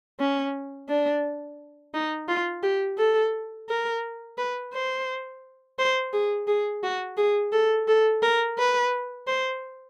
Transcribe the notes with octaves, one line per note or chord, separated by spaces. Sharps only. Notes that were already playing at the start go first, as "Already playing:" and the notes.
C#4
D4
D#4
F4
G4
A4
A#4
B4
C5
C5
G#4
G#4
F#4
G#4
A4
A4
A#4
B4
C5